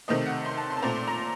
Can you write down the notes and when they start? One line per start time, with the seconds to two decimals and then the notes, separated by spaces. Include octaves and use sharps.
0.08 C3 D#3 A3 C4 D#5
0.26 F#5
0.46 C6
0.57 A5
0.70 C6
0.77 A5
0.82 A#2 A3 C4 A#5
0.96 C6
1.08 A#5